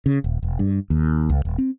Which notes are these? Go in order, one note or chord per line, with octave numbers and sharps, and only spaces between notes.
C#3
D#1
E1
G2
D#2
C#2
D#1
C4